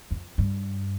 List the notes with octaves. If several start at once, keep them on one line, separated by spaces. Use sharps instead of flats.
F2
G2